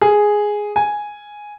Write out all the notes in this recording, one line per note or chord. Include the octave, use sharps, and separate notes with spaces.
G#4
G#5